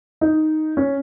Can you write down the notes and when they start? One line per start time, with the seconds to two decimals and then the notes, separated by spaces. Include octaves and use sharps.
0.21 D#4
0.77 C#4